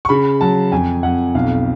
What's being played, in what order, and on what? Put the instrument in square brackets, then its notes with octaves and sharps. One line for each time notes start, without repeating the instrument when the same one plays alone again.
[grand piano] C#6
C#3 B5
F#3 A5
F2 G#5
F2 F#5
B1 F5